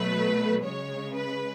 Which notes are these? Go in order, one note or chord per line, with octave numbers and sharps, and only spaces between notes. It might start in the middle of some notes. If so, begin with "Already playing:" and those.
Already playing: B2 F#3 A3 B4
C#3 G#3 C#5
B4